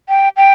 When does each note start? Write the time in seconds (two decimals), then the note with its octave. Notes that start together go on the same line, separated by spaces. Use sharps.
0.09 G5
0.37 G5